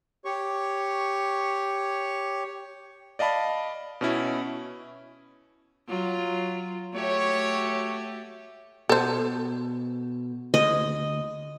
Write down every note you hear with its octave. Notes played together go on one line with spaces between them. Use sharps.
G4 C#5 C#6
D5 D#5 F5 A5 B5
B2 C#4 E4
F#3 F4
A3 F#4 G4 C#5
B2 A4 C5
D2 D#5